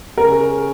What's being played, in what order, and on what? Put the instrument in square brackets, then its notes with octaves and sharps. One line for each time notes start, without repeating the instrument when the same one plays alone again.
[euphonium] C#3 [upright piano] A#4